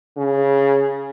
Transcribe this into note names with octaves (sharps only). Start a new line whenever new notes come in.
C#3